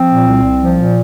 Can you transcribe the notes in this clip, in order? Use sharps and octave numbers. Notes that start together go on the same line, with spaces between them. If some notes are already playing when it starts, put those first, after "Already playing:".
Already playing: F3 C4
A#2
C2
C2
F3
A#2